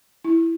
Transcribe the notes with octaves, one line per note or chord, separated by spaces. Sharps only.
E4